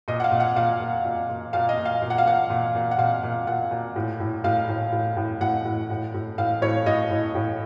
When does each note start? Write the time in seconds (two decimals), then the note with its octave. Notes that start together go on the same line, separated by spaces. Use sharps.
0.08 A#2 D#5
0.20 F#5
0.24 F5
0.32 A#2
0.40 F#5
0.56 A#2 F5
0.80 A#2
1.05 A#2
1.30 A#2
1.53 A#2 F5
1.69 D#5
1.78 A#2
1.85 F5
2.02 A#2
2.10 F#5
2.18 F5
2.26 A#2 F#5
2.50 A#2
2.75 A#2
2.91 F#5
2.98 A#2 F5
3.24 A#2
3.47 A#2 F#5
3.71 A#2
3.96 A2
4.20 A2
4.44 A2 F5
4.69 A2
4.93 A2
5.17 A2
5.41 A2 F#5
5.65 A2
5.90 A2
6.14 A2
6.38 A2 F5
6.62 A2 C#5
6.86 A2 D#5
7.11 A2
7.35 A2